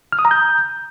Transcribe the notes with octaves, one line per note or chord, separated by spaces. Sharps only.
F6
D#6
A#5
G6